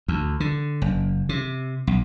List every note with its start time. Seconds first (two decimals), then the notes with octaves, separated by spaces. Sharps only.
0.08 D2
0.40 D3
0.82 F#1
1.29 C3
1.87 B1